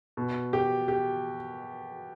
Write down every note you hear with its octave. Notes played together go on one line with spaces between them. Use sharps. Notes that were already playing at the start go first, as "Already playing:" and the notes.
B2
G4
G4